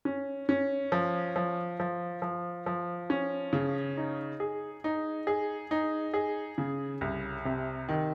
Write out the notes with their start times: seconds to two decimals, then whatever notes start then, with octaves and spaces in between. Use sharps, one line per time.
0.05 C#4
0.49 C#4
0.92 F3
1.36 F3
1.80 F3
2.22 F3
2.66 F3
3.10 C#4
3.53 C#3
3.97 D#4
4.40 G#4
4.84 D#4
5.27 G#4
5.71 D#4
6.14 G#4
6.58 C#3
7.01 C2
7.45 C3
7.89 D#3